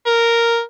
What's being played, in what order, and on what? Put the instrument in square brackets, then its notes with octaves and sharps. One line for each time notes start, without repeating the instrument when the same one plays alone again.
[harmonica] A#4